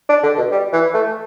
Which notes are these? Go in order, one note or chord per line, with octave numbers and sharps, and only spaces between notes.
D4
D3
B2
G3
E3
A3